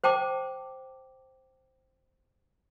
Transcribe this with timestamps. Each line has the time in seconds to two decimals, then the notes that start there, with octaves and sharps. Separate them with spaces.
0.04 C5 G5 A5 D6